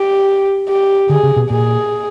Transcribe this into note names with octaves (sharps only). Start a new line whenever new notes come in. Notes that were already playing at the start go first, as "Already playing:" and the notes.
Already playing: G4
G4
D3 G#4
C#3
B2
A#2 G#4